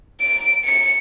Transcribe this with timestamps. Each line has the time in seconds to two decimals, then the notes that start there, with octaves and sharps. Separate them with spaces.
0.21 D7
0.65 C#7